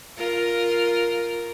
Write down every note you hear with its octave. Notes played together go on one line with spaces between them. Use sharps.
F4 A#4